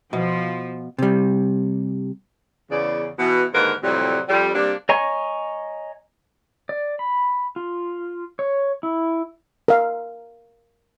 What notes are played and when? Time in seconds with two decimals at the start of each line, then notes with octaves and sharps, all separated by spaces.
0.13 B2 F3
0.98 C3 G3
2.70 E2 C#3 D5
3.19 B2 E3
3.53 D#2 G#2 D3 F#4 A#4 B4
3.82 F2 A2 C3 F#3 G3
4.28 F2 G3
4.54 C3 G3 A#3 D4
4.89 C#5 D#5 G#5 A#5 C#6
6.69 D5
6.99 B5
7.56 F4
8.39 C#5
8.83 E4
9.68 A#4 F5